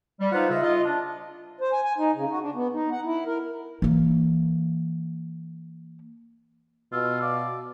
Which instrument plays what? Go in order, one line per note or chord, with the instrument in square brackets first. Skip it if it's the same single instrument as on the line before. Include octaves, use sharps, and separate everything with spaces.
[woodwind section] G3
D#4 F4 B4 C5 F5 F#5
C#3 F4 D#5 E5
F4 D#5
D4
[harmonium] C5
G#5
G#5
D#4
C#3
F#4
D4
B3
D#4
F#5
E4
A#4
[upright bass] E3 A#3
[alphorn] B2 [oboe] F4 [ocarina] E6
[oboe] D5 [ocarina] F5